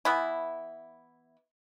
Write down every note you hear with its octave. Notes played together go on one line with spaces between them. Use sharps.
E3 B3 E4